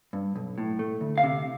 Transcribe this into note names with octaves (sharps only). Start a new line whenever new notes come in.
G2
B1
A2
A3
D2
F5
C3